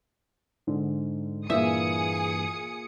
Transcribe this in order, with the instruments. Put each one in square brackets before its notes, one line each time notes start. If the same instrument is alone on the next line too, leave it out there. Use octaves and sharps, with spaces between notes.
[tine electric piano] G#2 [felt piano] D3
[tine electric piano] G2 E3 A#3 [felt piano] A#2 [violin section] G#4 D#6 C#7 [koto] E5